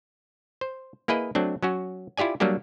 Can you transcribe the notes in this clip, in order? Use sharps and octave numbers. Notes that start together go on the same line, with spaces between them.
C5
A#3 E4 G#4 B4 D#5
F#3 A3 C4 D4
F#3 C#4 F#4
E4 F4 G4 D5 G#5
F#3 G3 A#3 D4 G4